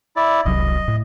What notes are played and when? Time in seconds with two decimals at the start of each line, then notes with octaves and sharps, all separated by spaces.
0.16 E4 D5
0.45 E1 C2 F#3 D#5
0.88 A2